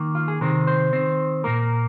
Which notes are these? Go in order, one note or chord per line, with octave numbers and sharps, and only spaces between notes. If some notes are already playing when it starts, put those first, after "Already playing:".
Already playing: D#3 A#3
F4
G#4
C3 D#3 C4 A#4
C5
D#3 C4
A#2 A#3 A#4